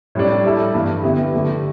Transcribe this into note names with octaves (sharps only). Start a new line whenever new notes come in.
A2 G3 D4
G3 E4 A4
G2 E3 A3
D3 B3 E4 G4
D3 A3 G4